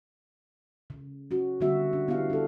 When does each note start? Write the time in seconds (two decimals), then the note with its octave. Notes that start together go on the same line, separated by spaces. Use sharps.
0.90 C#3
1.31 C#4 F#4
1.60 D3 G3 B3 F#4 E5
1.93 D4
2.08 B3 E4 G4 F5
2.30 D4 A4